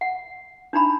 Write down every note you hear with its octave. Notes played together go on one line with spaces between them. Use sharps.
F#5
D4 D#4 A#5 B5